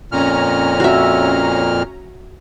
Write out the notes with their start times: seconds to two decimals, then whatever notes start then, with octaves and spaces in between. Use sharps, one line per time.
0.12 F2 A#2 C#4 A#5 F6
0.80 F#4 E5